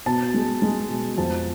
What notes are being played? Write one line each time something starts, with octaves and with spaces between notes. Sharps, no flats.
B2 A5
G#3
G#3
B2
F2 A5